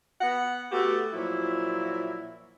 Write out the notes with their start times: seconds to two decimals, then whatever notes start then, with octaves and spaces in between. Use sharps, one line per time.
0.21 B3 F#5
0.71 A3 B3 F#4 G4
1.13 A#2 F3 F#3 E4